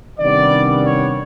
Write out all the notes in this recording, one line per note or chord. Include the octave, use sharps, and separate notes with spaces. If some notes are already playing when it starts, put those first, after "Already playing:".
C3 D#3 G3 B3 D4 D5
C#5